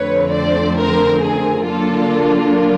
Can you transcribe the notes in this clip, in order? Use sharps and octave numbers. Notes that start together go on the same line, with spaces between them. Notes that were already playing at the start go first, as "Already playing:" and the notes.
Already playing: F2 D3 F3 A3 C4 B4 C#5
C5 D5
A#4 C5
G#4 A#4
D3 F#3 A#3 D4 F4 A4